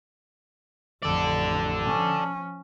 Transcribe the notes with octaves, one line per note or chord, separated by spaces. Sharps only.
A1 F2 A4 D5
F3 C#4